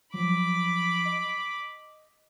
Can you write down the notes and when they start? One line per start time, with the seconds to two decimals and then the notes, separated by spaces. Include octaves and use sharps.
0.14 F3 F#3 B5 D6
1.05 D#5